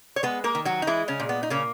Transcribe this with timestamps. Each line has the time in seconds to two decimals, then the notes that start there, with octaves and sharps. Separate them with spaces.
0.16 C#5
0.23 G#3 B3 B4
0.44 A#3 A#4
0.55 D#3
0.65 F#3 F#4
0.82 D#4
0.87 E3 G#3 E4
1.08 C#3 C#4
1.20 A#2
1.29 B3
1.43 D#4
1.50 C#3 A#3 C#4